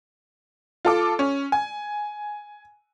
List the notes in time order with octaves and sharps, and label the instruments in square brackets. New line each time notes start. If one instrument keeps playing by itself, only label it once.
[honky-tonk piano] F4 A4 D6
C#4
G#5